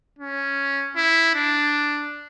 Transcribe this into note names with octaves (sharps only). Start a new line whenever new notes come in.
C#4
E4
D4